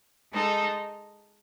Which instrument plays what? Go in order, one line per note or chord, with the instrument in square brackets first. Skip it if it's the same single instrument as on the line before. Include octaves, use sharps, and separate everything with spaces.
[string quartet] G#3 D#4 A4